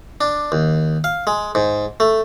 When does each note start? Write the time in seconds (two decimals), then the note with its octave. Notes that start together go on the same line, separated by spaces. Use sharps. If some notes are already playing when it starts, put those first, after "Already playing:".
0.21 D4
0.52 D#2
1.04 F5
1.27 G#3
1.55 G#2
2.00 A3